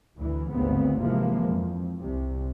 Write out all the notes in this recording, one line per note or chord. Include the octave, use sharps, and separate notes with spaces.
D2 E3
G#1 D2 G2 C#3 B3 C4
C3 E3 F3 G#3 A#3
F2
C2 C3